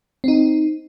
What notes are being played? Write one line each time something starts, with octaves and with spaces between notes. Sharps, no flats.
C4 D#4